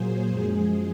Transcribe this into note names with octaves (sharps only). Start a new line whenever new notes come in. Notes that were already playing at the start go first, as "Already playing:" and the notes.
Already playing: A#2 F#3 A#3 G#4 C5
F#2 F3 G#3